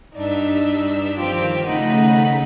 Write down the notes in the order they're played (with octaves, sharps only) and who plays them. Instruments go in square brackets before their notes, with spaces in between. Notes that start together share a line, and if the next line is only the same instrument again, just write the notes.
[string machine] G2 E6 B6 [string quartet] D4 D#4
[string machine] D#3 F3 [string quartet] C4 G4 [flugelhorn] F4
[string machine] C#3 A3 B5 [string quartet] D#4 [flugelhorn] F#5